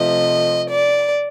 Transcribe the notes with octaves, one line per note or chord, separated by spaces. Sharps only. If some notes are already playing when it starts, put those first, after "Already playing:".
Already playing: C3 F3 A3 D#5
D5